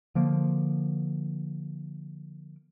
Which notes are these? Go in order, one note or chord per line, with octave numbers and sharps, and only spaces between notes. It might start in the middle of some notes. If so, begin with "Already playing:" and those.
D3 F3 A#3